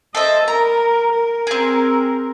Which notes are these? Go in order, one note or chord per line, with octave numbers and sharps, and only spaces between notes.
A4 C5 D#5 E5
A#4 A#5
A#4
C4 G#4